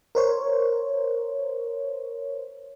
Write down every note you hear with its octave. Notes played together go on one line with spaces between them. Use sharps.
A#4 C5 C#5